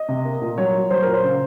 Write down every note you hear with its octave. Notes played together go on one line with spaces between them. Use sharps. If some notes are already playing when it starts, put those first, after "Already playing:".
Already playing: D#5
C3
A#3
A#2
F#3 C#5
F#3
F#3 C5
A#2 A#4
C5
C#3